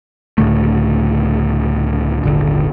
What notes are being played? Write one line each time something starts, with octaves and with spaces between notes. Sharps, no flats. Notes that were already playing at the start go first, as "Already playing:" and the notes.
C#2 A2 D3 A3
D#1 G#1 D3